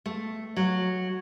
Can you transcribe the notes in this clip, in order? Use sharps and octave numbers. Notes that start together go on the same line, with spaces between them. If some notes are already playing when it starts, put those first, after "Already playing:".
A3
F#3